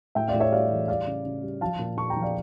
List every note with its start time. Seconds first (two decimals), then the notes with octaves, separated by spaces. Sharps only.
0.15 A2 E5 G5
0.28 D5 F5
0.34 A2
0.40 C#5 E5
0.52 G3 D5 F5
0.71 E3
0.88 G3 D5 F5
1.07 C#3
1.25 C#3
1.43 G3
1.61 F3 F5 A5
1.79 A#2
1.97 A#2 A5 C#6
2.10 G5 A#5
2.17 F3
2.22 D5 F5